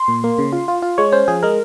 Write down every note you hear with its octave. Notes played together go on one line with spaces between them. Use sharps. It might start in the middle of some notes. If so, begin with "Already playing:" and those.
Already playing: C6
A#2
A#3
C#3
F4
F4
F4
G#3 C#5
C#4 C5
F3 G#4
G#3 A#4